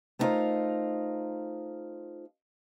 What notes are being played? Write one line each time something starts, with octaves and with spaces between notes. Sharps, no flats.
A3 B3 D#4 F4 A#4 C5